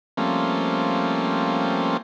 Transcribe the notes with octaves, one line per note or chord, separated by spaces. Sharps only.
F3 G3 A3 A#3 C4 C#4